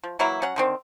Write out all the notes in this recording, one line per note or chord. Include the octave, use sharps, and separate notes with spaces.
F3
E3 F#3 A#3 E4
F#3 C#4 F#5
D3 D#3 C4